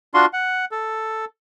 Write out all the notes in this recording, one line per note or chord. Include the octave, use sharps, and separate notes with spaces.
D4 F4 F#4 C6
F#5
A4